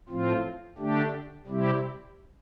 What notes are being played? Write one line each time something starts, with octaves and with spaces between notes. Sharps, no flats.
A2 F3 C4 F4
D3 A3 D4 G4
C3 G3 C4 E4 G4